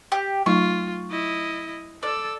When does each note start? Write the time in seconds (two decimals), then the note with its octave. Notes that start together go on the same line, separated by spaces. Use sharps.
0.12 G4
0.46 F#3 A3 D#4 F4 C#6
1.11 E4 D#5
2.03 A4 D5 E6